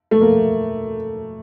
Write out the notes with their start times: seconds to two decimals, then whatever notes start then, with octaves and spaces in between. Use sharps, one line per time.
0.11 A3
0.21 A#3